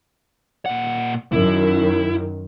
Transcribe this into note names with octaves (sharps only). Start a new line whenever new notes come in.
A#2 F#5
F#2 D#3 E4